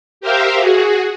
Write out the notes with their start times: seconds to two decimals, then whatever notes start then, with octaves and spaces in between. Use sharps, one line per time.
0.21 G4 A#4 C5 E5 F5
0.59 F#4 G#4